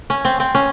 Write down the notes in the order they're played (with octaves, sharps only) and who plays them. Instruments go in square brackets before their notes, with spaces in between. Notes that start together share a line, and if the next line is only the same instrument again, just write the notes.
[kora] C#4
C4
C4
C#4